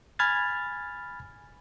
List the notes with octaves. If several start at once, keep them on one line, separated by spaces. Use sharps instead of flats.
G#5 B5 F6 G#6 A6